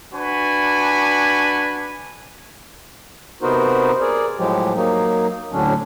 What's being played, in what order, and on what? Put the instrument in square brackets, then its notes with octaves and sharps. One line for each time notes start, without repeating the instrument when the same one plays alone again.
[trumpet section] D4 F#4 B4 G#5
[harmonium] C3 B3 D#4 F#4 A#4 C5
G#4 A#4 D5
A2 F3 F#3 G#3 G4
F#3 A#3 D#4
D2 A2 D3 F#3 C#4 D4